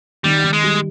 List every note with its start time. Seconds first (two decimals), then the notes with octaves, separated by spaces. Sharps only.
0.24 D#3 G3
0.44 D#3
0.53 G#3
0.63 G3